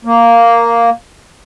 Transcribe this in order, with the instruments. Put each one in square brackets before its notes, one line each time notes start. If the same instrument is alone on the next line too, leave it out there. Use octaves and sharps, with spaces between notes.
[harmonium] A#3